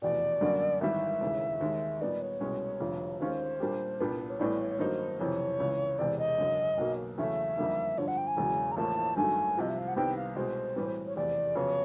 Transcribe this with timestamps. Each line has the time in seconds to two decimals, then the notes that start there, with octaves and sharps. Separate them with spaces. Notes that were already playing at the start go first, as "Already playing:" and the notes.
0.02 F1 E2 B2 D5
0.41 F#2 D3 G3 A#3 C#4
0.81 G#1 G#2 E3 G3 E5
1.21 E1 D#2 C#3 E3
1.61 D#2 D#3 G#3
2.01 A#2 G3 B3 D#4 D5
2.21 C#5
2.40 C2 B2 G#3 C#4
2.80 F1 F2 D3 F3
3.20 D#2 D#3 G#3 C#4 F4 C5
3.60 A#2 G3 A#3 D4 G4
4.00 C2 A#2 G3 B3 D4 B4
4.09 A#4
4.20 B4
4.30 C#5
4.40 A1 A2 E3 G3 B3 D5
4.60 C#5
4.79 G2 D#3 F#3 A#3 D#4 C5
5.19 F#1 F2 C3 E3 C#5
5.59 C#2 C#3 E3
5.98 E1 E2 C3 D5
6.18 D#5
6.38 F#1 F#2 D3 F#3
6.78 B1 B2 F#3 A#3
7.18 E2 C#3 F#3 A3 C#4 E5
7.57 F2 D3 G3 A#3 D#4
7.98 G2 D3 F3 C#5
8.08 F#5
8.18 G5
8.27 G#5
8.37 E1 E2 C#3 F#3
8.71 A#5
8.77 A1 A2 F3 A#3 A5
9.17 G#1 G2 D#3 F#3 A3 G#5
9.57 C2 C3 F3 D#5
9.69 E5
9.79 F5
9.88 F#5
9.96 C2 C3 D#3 G3 B3 G5
10.16 F5
10.36 C2 B2 G#3 C5
10.76 A2 E3 G3 C4 B4
10.87 C5
11.06 C#5
11.16 F1 E2 C3 D5
11.56 F2 C#3 F#3 B3 C#5